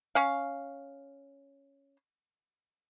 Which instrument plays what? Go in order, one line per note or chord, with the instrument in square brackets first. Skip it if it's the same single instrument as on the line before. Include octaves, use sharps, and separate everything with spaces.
[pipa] C#4 F5